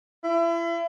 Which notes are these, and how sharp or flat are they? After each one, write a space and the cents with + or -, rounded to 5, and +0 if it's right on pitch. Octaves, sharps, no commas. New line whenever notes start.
E4 +35